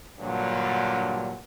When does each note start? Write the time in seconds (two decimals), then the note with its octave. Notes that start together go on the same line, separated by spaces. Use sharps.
0.19 G2 A#2 D3 F#3